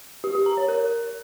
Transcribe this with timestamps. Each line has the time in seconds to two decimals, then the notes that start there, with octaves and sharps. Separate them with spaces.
0.24 G4
0.35 G4
0.46 A#5
0.57 C#5
0.68 A#4